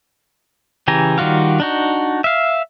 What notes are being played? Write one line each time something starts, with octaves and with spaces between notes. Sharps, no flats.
C#3 E3 G4 G#5 A#5
D#3 G3 F4 F#4 F5
D4 D#4 F#4
E5 F5